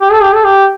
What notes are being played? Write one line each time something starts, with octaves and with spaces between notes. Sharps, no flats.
G4
A4
G4
A4
G4